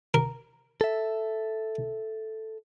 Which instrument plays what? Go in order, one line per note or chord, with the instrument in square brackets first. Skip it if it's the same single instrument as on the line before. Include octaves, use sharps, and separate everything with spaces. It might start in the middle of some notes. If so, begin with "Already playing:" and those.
[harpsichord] A#4
[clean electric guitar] A4 E5